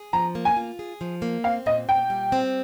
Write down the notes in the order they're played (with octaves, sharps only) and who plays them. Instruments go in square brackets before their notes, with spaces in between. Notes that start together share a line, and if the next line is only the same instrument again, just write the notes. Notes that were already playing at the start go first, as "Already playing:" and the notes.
Already playing: [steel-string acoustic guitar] G#4
[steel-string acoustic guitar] F3 [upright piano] A#5
[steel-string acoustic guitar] A#3
[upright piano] G#5
[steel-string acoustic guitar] F4
G#4
F3
A#3
[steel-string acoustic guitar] C4 [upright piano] F5
[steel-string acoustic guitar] A#2 [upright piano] D#5
[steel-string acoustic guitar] A#2 [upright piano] G5
[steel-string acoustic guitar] G3
C4